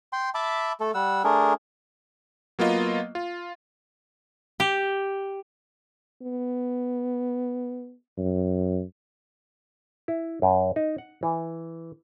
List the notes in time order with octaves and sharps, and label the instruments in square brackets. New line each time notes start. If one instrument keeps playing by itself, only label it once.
[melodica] G5 C6
E5 A5 B5 D6
A3 A4
G3 F#5 E6
A3 D4 G#4 A#4
[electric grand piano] F#3 A#3 B3 F4 D#5
F4
[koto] G4
[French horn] B3
[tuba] F#2
[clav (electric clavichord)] E4
F#2
D#4
F#5
E3